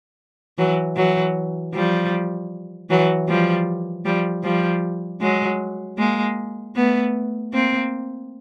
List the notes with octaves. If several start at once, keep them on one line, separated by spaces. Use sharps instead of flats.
E3 F#3
E3 F#3
F3 G3
E3 F#3
F3 G3
F3 G3
F3 G3
F#3 G#3
G#3 A#3
A3 B3
A#3 C4